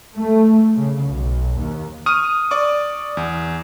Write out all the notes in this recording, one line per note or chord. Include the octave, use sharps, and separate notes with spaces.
A3
C#3
B1
D#2
C#6 D#6 F6 D#7
D5 C#6 D6
E2